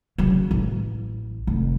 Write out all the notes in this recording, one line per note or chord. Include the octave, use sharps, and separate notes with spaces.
C#3 F#3
A1
F1